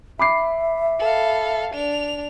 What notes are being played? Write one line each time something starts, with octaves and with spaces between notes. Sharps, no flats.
E5 B5 D6 C7
A4 F5
D4 F7